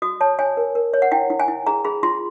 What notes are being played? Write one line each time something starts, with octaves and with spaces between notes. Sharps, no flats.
F#4 D#6
C#5 A5
C#5 G#5
A#4
A#4
C#5
F#5
E4 G5
E4
G#5
E4
G#4 A#5
G#4 B5
F4 C6